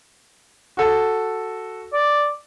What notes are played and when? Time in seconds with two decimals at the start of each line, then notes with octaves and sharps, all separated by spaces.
0.77 F#4 A4
1.93 D5